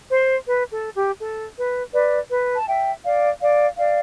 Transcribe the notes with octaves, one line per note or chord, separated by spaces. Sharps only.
C5
B4
A4
G4
A4
B4
B4 D5
B4
A5
E5 G5
D5 F5
D5 F5
D5 F5